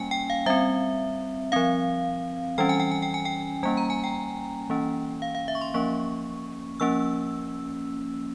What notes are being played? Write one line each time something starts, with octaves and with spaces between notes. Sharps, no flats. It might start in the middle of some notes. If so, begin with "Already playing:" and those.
Already playing: G3 A#3 C#4 G5 G#5
G5
F5
G3 C4 E5
F3 C4 F5
E3 G3 C#4 G5
G#5
G5
G#5
G5
G#5
G5
G3 A#3 C#4 G#5
A#5
G#5
G5
E3 A#3 C#4
F5
F5
E5
C#6
C6
F3 A#3 C#4 C#6
F3 A#3 C#4 E6